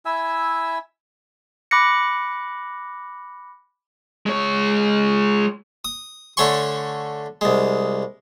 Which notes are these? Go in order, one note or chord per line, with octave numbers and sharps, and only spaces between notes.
E4 E5 G#5 E6
B5 D6 F#6 A#6 C#7
G#3 C#5
D#6
D3 A3 C#5 G#5 C6 C#6
C2 G#3